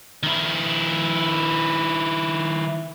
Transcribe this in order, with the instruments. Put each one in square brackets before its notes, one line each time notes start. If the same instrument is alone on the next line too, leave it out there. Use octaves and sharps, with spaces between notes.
[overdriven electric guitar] D#3 E4